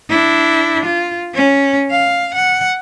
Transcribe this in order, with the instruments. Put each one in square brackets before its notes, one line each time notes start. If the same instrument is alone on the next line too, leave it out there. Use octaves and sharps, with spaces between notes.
[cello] D4 E4
F4
C#4
F5
F#5